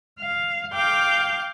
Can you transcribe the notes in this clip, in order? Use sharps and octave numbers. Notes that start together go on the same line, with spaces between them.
F5
F5 G5 D6 G6